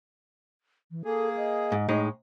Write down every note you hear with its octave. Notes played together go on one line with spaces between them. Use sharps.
E3
A#3 G#4 A4
D#5
G#2
A2 G#3 D#4